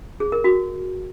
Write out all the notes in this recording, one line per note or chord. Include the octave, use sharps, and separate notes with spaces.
G#4
A#4
F#4